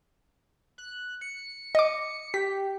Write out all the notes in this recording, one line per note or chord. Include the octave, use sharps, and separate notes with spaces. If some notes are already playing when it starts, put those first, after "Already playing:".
F#6
C#7
D#5 D6
G4 B6